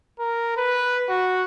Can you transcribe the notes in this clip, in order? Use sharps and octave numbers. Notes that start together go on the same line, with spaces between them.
A#4
B4
F#4